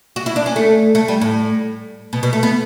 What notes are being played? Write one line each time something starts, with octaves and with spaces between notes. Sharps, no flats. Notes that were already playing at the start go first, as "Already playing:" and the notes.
F#4
E4
D4
C#4
A3
A3
G3
A2
B2
B2
A3
B3